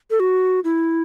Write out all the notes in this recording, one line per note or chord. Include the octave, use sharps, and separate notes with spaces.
A4
F#4
E4